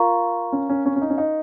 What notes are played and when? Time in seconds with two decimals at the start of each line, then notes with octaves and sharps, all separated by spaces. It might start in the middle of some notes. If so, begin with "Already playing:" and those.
Already playing: F4 A#4 F5 A#5 C#6
0.52 C#4
0.70 C#4
0.86 C#4
0.96 C#4
1.02 D#4
1.10 C#4
1.18 D#4